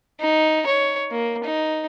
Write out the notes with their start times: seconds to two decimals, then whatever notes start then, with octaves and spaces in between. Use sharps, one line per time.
0.20 D#4
0.66 C#5
1.11 A#3
1.44 D#4